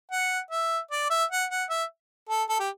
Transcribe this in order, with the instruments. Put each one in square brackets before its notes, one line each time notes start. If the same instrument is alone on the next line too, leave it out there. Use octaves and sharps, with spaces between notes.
[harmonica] F#5
E5
D5
E5
F#5
F#5
E5
A4
A4
G4